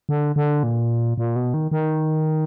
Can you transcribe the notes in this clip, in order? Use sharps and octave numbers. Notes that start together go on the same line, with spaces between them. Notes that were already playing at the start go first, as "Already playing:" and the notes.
D3
D3
A#2
A#2
B2
D#3
D#3